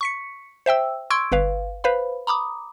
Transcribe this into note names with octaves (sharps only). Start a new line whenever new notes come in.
C#6 B6 C#7
C5 E5 G5 E6
C6 C#6 E6 G#6 D7
G1 B4 F5
B4 C5 F5 B5
A#5 B5 D6 D#6